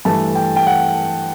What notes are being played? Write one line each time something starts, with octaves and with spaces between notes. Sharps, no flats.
G2 E3 A3 A5
G5
G5
F#5